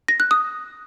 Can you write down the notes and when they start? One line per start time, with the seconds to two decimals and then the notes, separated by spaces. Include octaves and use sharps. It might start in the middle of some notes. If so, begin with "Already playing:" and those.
0.08 A#6
0.20 F#6
0.31 D#6